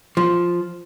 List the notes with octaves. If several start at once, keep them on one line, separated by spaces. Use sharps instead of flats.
F3